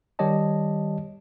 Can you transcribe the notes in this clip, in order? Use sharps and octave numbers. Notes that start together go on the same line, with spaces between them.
D#3 G3 G4 C#5 D#5 A5